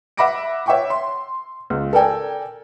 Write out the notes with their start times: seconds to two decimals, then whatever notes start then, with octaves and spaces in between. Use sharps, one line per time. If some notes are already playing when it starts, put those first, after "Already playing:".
0.17 E5 F#5 B5 D6 A#6 D7
0.66 C#5 E5 F#5 G5 C#6 D6
0.90 C6
1.70 C#2
1.93 A4 A#4 D5 G5 G#5